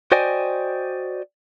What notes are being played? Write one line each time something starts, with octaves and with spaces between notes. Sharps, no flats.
F#4 C5 D5 D#5 G5 G#5